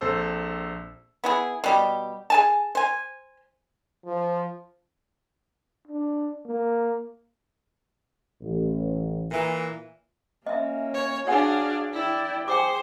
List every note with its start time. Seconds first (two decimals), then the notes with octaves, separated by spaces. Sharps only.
0.01 A#1 C4 A4 C5 A5 E6
1.24 B3 E4 G#4
1.64 B2 G3 G4
2.30 G#4 G#5 A5
2.75 C5 G#5
4.06 F3
5.88 D4
6.46 A#3
8.41 A1
9.31 A#2 E3
10.46 A#3 C#4 D#5 E5
10.94 C#5
11.27 D4 F#4 G#4 C#5 F5 F#5 G#5
11.93 E4 D5 G5
12.48 G#4 C5 G5 D6